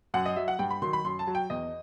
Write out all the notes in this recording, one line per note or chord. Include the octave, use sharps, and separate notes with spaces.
F#2 F#5
D#5
F#3 E5
F#5
G2 G5
B5
D#3 F#3 C6
B5
F#2 C6
A5
F#3
G5
E2 D#5